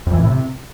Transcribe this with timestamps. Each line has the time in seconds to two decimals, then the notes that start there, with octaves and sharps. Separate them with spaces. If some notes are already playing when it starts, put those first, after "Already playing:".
0.07 F2
0.13 E3
0.20 A2
0.26 C3